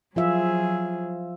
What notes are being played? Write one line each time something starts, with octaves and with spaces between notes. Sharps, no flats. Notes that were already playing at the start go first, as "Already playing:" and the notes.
F3 F#3 F4 G#4 E5